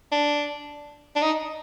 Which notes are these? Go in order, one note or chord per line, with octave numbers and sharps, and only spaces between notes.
D4
D4
D#4